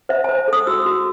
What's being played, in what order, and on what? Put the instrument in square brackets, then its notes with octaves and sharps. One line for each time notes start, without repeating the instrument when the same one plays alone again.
[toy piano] C5 E5
A5
C5
A4 D#6
F#4 E6
F#4